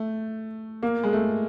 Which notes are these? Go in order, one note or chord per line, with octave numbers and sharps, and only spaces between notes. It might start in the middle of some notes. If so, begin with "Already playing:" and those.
Already playing: A3
A#3
G#3
A3